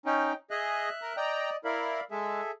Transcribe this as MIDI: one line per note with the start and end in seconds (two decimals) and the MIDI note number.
0.06 0.33 61
0.06 0.33 63
0.06 0.34 79
0.51 0.89 68
0.51 0.89 75
0.51 1.16 76
0.51 1.16 90
1.02 1.13 70
1.17 1.56 74
1.17 1.56 75
1.17 1.50 79
1.17 1.50 82
1.65 2.00 64
1.65 2.00 70
1.65 2.04 74
1.65 2.04 77
1.65 2.04 83
2.11 2.41 56
2.11 2.51 68
2.11 2.51 69
2.11 2.51 76